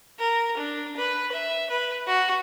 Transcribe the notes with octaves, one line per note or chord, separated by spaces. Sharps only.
A#4
D4
B4
E5
B4
F#4